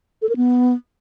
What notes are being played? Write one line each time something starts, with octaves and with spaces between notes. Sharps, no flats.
A4
A#4
B3